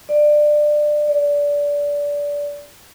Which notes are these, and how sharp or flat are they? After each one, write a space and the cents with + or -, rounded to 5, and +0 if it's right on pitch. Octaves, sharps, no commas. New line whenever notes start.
D5 +20
D5 -20